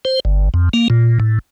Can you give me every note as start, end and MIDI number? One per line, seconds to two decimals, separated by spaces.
0.05 0.20 72
0.25 0.49 31
0.54 0.69 41
0.73 0.88 58
0.90 1.19 46
1.20 1.39 45